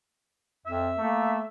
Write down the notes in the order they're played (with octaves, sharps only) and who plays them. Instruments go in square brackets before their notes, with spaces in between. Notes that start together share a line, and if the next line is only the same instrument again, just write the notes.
[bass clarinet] F2 [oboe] E5
[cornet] A3 [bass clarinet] A#3